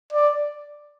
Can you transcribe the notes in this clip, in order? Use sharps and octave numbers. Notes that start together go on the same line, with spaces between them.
D5